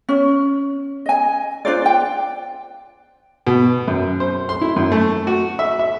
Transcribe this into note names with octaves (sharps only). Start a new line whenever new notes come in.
C#4
D#5 G#5
D4 F4 C5 D5
G5
B2
F#2
C5
C6
E4
F#2
A3
F#4
E5
E5